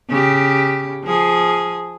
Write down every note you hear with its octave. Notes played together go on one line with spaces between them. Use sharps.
C#3 G4
F3 G#4